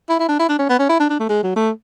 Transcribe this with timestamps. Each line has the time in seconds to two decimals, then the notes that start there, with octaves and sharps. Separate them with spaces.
0.09 E4
0.20 E4
0.29 D4
0.40 E4
0.49 D4
0.59 C#4
0.70 B3
0.79 C#4
0.89 E4
1.00 D4
1.10 D4
1.20 A3
1.29 G#3
1.43 F#3
1.56 A3